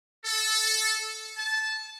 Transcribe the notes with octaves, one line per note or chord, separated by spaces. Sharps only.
A4
A5